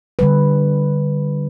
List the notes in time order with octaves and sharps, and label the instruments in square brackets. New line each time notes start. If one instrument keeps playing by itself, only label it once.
[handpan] D3 G3 B4